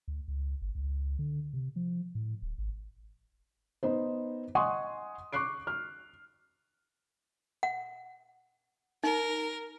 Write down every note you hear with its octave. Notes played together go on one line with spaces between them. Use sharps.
D2
C#2
G1
C#2
D3
C3
F3
A2
D1
G#1
B3 D#4 C5
D#5 F#5 G#5 C6 C#6 D#6
C#6 D6 F#6 C7 D7
F6
F#5
D#4 A#4